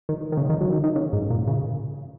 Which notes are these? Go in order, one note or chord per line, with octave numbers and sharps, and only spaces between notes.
D#3
D#3
C#3
D#3
F#3
D#3
D#3
C#3
G#2
A#2
C#3